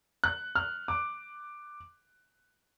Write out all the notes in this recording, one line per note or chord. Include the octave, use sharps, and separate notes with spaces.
F#6
F6
D6